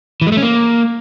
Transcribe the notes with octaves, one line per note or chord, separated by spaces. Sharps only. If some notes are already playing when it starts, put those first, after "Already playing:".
E3
G#3
A3
C#4
A#3